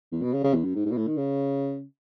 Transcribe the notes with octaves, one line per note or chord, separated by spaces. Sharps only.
E2
B2
C#3
C#3
E2
F#2
G#2
G#2
B2
A2
D#3
C#3